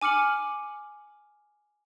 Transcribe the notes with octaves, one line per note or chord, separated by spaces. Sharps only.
G#5 D6 F6 C#7 F#7